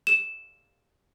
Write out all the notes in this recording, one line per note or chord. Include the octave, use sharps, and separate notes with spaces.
E7